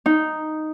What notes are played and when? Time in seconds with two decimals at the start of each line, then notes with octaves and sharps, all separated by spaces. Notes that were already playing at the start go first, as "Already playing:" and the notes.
0.06 D#4